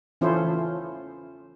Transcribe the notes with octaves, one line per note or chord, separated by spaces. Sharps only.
E3 C#4 E4 F4 A4 C5